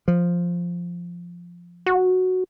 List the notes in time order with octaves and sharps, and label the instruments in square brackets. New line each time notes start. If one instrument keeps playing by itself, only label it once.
[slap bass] F3
[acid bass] F#4